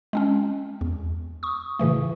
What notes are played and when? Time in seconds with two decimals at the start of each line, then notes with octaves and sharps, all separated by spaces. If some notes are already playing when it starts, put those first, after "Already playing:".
0.13 G#3 C4 C#4
0.81 E2
1.43 C#6 D#6
1.79 A2 C#3 E3 A3